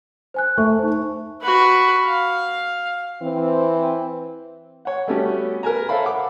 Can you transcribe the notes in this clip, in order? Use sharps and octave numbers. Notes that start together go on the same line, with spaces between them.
C5 G#5 F#6
A3 C#6
D#4 C5
F#4 B4
F5
E3 C4
C#5 F#5
G3 A3 B3 C#4 F#4 G4
A#4 B4 G#5 A#5
A4 C5 C#5 E5 F5 B5
F#5 D6